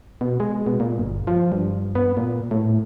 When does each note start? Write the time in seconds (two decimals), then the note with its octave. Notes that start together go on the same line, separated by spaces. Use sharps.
0.21 B2
0.40 G#3
0.67 B2
0.80 A#2
1.00 G1
1.27 F3
1.52 G2
1.95 B3
2.17 A#2
2.51 A2